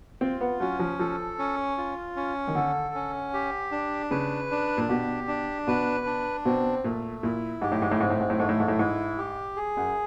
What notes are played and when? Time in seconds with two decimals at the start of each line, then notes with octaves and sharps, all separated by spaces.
0.21 C4 F4
0.41 B3
0.60 F#3 C#4
0.79 F3
0.99 F3 A4
1.39 C#4
1.78 F4
2.16 C#4
2.47 D#3
2.55 D3 A4
2.95 C#4
3.33 G4
3.72 D4
4.11 C#3 B4
4.51 D4
4.77 A#2
4.89 B2 G4
5.28 D4
5.67 B2 B4
6.06 D4
6.45 B2 C4
6.84 A#2 A3
7.23 A#2 E4
7.61 G#2 G4
7.72 A2
7.82 G#2
7.91 A2
8.00 G#2 C4
8.10 A2
8.20 G#2
8.30 A2
8.39 G#2 A3
8.49 A2
8.60 G#2
8.68 A2
8.79 G#2 E4
9.18 G4
9.56 G#4
9.77 F#2